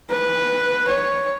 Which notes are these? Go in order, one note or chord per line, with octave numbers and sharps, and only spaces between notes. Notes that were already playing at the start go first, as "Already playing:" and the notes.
B4
C#5